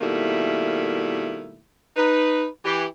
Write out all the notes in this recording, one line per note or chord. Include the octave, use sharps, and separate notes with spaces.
B2 D#3 G3 A3 A#3 E4
D#4 B4
E3 G4